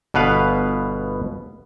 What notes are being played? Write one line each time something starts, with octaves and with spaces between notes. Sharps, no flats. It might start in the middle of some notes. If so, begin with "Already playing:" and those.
G1 B2 B3 B4 F5